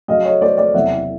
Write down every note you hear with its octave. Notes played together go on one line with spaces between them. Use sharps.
F#2 C#3 F#3 D#5 F5
C#5 D#5
C5 D5
C5 D5
F#1 E2 C3 E5 F#5